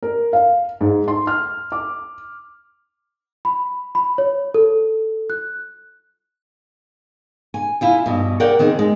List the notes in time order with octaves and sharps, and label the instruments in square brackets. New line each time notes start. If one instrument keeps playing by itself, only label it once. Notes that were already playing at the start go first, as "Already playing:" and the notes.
[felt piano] A#4
F5
G#2
C6
F6
D6
[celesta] B5
B5
C#5
A4
F#6
[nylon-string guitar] G#5
E4 F4 G#5
G2 B2
A#4 D5 F#5 G5
D#3 C4 G#4
G#3